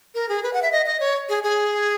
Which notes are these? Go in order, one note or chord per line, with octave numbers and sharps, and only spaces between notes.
A#4
G#4
B4
F#5
E5
D#5
D#5
C#5
G#4
G#4